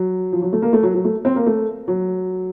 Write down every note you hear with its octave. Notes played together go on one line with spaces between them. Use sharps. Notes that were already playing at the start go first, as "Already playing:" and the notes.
Already playing: F#3
F3
F#3
A3
A#3
A3
F#3
F#3
A3
C4
A#3
A3
F#3